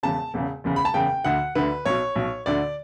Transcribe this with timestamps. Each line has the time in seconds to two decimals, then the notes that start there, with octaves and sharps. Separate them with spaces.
0.03 E1 E2 C#3 A5
0.34 E1 E2 C#3
0.64 F#1 E2 C#3
0.76 B5
0.85 A5
0.94 F#1 E2 C#3 G5
1.24 D2 D3 F#5
1.55 D2 D3 B4
1.86 B1 B2 C#5
2.16 B1 B2
2.46 D2 D3 D5